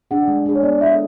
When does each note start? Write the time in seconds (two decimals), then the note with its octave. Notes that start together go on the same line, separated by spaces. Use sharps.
0.11 D4 G#4 F#5
0.28 G#3
0.46 D4 G#4
0.55 C#5
0.63 B3 D5
0.81 E4 A4 E5